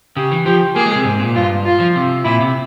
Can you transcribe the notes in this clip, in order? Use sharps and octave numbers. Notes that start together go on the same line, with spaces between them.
C#3 G4
E3
F3 G4
A#3 G#4
G#3
C3
G#2
A#2
G2 F4
F4
F3
C3
A#2 E4
C3